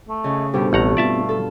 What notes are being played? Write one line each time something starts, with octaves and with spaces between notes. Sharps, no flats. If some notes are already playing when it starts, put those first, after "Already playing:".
A3
C#3 D#5 G#5
G2 B2 D4 G4 A4 C5
A1 A3 B3 C4 G4 F#5 A#5
F4 D5 E5 A5
A4